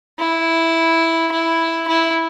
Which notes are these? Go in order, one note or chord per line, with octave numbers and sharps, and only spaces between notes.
E4
E4
E4